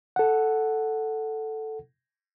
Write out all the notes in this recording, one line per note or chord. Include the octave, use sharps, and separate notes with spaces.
A4 F#5